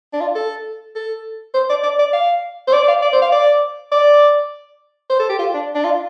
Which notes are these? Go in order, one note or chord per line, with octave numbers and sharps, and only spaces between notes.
D4
F4
A4
A4
C5
D5
D5
D5
F5
C5
D5
D5
F5
D5
C5
F5
D5
D5
C5
A4
G4
F4
D4
D4
F4